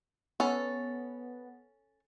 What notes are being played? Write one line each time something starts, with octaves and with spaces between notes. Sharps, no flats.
B3 C#4 A4